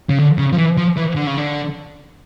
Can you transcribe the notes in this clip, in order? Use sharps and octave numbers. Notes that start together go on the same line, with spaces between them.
C#3
D3
C#3
F3
E3
F3
E3
D3
C#3
D3